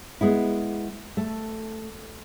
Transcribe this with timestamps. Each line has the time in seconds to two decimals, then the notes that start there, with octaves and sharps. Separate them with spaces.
0.21 G#3 B3 E4
1.17 A3